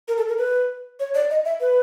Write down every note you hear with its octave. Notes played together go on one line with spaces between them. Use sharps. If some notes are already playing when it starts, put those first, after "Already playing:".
A#4
A4
A#4
B4
C#5
D5
D#5
E5
B4